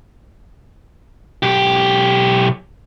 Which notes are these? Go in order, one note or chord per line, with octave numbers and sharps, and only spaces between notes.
B1 G4